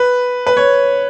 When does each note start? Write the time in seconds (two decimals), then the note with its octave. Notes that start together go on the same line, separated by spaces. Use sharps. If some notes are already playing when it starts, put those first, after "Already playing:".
Already playing: B4
0.47 B4
0.57 C#5